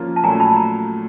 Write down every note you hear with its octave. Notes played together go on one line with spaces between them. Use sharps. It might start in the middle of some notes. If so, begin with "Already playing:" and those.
Already playing: F3 A#3 C#4 F4
A5
A#2 F#3 A3 C#4 G#5 A#5
A5 B5
A#5